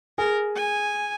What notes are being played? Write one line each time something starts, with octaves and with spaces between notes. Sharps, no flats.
G#4 A#4
G#5